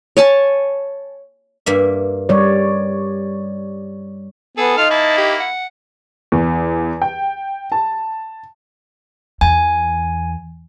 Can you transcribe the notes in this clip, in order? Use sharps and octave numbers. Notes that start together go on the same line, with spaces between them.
C#5 G#5 A5
G2 A#3 E5
G3 C#5 D5
B3 G#4 A4
D#4 F4 F6
A#3 E4 A5
G4
F#5
E2
G5
A5
E2 G#5